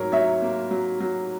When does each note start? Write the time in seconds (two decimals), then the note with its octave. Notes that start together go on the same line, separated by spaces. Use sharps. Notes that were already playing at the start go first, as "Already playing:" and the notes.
Already playing: G#2 F#3 A#4 C#5
0.12 F#3 C#5 E5
0.42 A#3
0.71 F#3
1.00 F#3